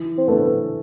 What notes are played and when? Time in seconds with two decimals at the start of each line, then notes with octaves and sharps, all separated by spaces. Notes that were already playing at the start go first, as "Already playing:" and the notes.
Already playing: E3
0.18 C4
0.28 A3 B3 D4 A4